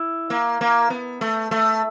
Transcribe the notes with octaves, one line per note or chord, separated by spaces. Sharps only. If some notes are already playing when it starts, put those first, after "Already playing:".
Already playing: E4
A#3
A#3
B3
A3
A3